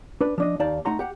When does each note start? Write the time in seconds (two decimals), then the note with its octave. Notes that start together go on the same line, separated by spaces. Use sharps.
0.21 D4 B4
0.38 F3 D4 D#5
0.60 D#2 D#4 D5 F5 A5
0.85 A3 D#4 F#5 A#5 C6
0.99 G4 F#5